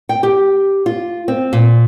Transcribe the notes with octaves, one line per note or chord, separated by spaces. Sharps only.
G5
G4
F4
C4
A#2